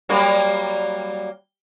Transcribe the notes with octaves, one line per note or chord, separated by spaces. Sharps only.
F#3 G3 A#3